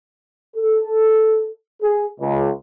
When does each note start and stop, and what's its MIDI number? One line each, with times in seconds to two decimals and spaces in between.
0.56 1.47 69
1.82 2.06 68
2.21 2.49 37